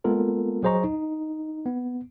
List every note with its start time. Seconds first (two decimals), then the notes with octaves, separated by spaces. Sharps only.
0.04 G#3 A#3 B3 F4 A4 A#4
0.63 F#3 G#4 C5 D#5 A#5 C#6
0.84 D#4
1.66 B3